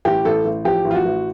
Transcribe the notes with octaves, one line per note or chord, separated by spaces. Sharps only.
A1 G4
A1 A4
A1
F3 G4
A1
F4
F#4
A1